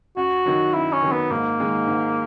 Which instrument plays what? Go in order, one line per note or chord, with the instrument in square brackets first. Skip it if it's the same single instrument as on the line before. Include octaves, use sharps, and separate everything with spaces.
[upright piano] F#2 [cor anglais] F#4
[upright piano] D#3 F#3
[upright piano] F#2 [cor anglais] E4
[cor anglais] C#4
[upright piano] D#3 F#3
[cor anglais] B3
[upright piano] G#2 [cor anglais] A#3
[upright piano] D#3 G#3
G#2